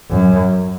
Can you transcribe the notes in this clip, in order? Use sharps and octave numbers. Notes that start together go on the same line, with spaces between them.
F#2